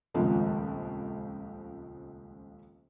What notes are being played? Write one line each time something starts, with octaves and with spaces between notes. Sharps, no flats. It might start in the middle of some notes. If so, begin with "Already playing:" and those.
D#1 G#1 C#2 F3 G#3 A3